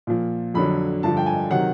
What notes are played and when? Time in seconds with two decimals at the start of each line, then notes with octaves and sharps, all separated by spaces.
0.07 A#2 F3
0.54 F2 D3 F#3 B5
1.03 G2 D3 F3 A5
1.17 G5
1.26 G#5
1.50 C3 D#3 F#3 F#5